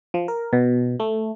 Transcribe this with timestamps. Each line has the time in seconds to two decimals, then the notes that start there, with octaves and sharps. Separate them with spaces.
0.14 F3
0.28 A#4
0.53 B2
1.00 A3